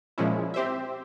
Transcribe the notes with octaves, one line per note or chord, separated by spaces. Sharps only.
A#2 F3 G#3 C#4 E4
C4 G4 C5 E5